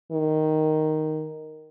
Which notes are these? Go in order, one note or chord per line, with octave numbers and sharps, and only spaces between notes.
D#3